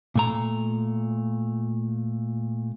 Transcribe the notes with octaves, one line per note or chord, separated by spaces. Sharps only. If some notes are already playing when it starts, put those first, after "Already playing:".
A#2 A3 A#5